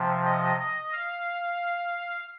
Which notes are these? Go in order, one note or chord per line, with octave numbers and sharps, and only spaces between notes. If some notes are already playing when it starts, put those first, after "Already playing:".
Already playing: C3 F3
D#5
D#5
F5